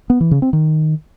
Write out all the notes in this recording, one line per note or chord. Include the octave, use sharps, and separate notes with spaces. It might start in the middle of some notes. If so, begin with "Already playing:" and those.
B3
E3
C#3
C4
D#3